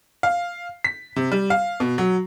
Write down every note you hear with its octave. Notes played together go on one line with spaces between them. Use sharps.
F5
B6
C3
G3
F5
B2
F#3